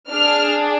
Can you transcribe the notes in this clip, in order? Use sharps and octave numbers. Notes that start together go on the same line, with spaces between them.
D4 G#4 F6